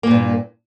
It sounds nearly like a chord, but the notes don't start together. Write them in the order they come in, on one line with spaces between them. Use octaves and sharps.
A#3 A#2 G2